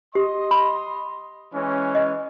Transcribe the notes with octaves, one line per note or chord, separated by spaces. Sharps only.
G4 D#5 C6
B5
E3 G#3 C#4
D#5